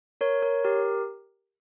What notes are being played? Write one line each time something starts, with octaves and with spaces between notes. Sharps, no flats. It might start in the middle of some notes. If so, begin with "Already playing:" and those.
A#4 C#5
A#4 C#5
G4 A#4